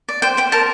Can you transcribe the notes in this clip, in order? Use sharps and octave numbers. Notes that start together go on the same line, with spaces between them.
D5
C5 G5
C5 G5
A#4 A5